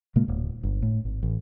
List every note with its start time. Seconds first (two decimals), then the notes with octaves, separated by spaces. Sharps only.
0.16 A#2 C#3 G#3 A#3
0.28 D1
0.63 G1
0.82 A2
1.05 G#1
1.23 A1